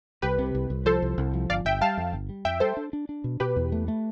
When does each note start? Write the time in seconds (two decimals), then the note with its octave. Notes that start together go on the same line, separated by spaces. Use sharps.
0.22 C2 G4 B4
0.39 C3
0.55 C2
0.70 C2
0.86 F3 A4 C5
1.02 C2
1.18 C2
1.34 F3
1.50 G1 D5 F5
1.65 G1 E5 G5
1.81 G3 F5 A5
1.97 F2
2.13 G1
2.29 G3
2.45 F2 E5 G5
2.60 G3 A4 C5
2.77 D4
2.93 D4
3.09 D4
3.24 B2
3.40 B2 G4 B4
3.56 E2
3.72 A3
3.88 A3